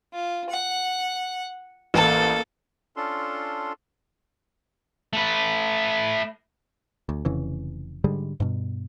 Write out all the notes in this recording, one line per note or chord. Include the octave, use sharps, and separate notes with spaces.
F4
F#5
A1 A#3 A4 A5
C#4 D4 F4 A4 C6
A3 B4
D2
F1 F2 C#3 E3
G#2 D3 G3 G#3
G2 B2